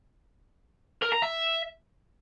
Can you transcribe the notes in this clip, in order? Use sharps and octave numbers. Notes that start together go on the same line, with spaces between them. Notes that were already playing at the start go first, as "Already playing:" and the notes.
A#4
A#5
E5